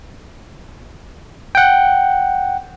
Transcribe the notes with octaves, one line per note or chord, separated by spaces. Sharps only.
F#5 G5